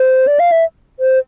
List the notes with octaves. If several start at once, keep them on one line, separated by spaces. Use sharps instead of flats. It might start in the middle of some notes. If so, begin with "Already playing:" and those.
Already playing: C5
D5
F5
E5
C5